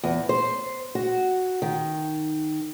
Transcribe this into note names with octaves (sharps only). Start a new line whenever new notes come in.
E2
C5
F#4
D#3